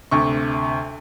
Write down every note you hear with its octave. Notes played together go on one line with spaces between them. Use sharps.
D2 C3 C#6